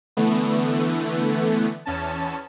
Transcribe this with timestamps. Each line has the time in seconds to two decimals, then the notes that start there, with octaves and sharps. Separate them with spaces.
0.17 D3 E3 A3 B3
1.86 E2 C#4 A5